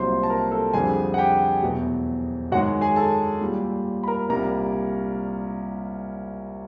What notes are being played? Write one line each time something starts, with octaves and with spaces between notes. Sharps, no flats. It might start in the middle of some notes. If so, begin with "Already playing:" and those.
Already playing: C2 A#2 F#3 C5 C6
A5
A#4 A#5
A4 A5
F2 D3 G3 G#4 G#5
F#5
G4 G5
E2 B2 F#3 A3
F#2 D#3 G#3 F#4 F#5
G#4 G#5
A4 A5
A#2 G3
B5
A#4 A#5
C2 A#2 G3 A#4 A#5